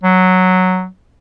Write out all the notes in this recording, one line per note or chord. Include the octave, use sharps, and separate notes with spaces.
F#3